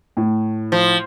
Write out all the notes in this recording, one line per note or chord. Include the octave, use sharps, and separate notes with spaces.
A2
F3